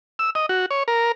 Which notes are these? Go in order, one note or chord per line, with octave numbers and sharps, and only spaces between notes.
E6
D#5
F#4
C#5
A#4